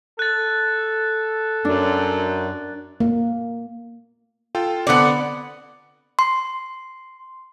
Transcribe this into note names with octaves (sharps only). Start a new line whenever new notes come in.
A4 F#6 A6
F#2 D4
A#3
F4 A4 G5
D3 B3 C4 D5
C6